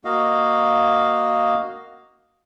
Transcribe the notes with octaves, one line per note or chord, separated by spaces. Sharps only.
A#3 F#4 D#5 F5